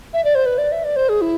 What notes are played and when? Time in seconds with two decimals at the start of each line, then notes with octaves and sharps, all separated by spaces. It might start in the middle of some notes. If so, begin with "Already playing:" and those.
0.13 E5
0.24 D5
0.35 C5
0.46 B4
0.58 D5
0.72 E5
0.84 D5
0.96 C5
1.09 G#4
1.21 E4